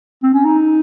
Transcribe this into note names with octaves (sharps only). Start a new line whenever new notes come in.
C4
C#4
D#4